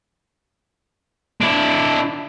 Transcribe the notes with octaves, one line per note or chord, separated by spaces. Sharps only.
D4 E4